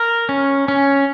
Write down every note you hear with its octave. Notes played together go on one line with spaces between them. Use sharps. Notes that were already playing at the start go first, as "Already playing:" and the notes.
Already playing: A#4
C#4
C#4